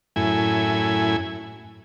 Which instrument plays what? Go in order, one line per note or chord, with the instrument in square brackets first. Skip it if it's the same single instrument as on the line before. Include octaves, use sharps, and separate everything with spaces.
[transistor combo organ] F#2 A2 E4 G#5